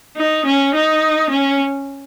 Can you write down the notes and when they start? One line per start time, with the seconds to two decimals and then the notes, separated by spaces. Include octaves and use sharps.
0.17 D#4
0.45 C#4
0.74 D#4
1.30 C#4